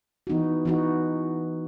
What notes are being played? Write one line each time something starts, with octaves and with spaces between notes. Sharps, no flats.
E3 B3 D#4 F#4
E3 B3 D#4 F#4